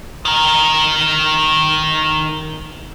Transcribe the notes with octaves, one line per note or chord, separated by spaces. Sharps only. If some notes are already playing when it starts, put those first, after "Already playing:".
D#3 A#4